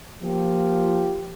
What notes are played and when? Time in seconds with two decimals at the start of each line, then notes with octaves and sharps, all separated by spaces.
0.22 F3 A#3 F4 G4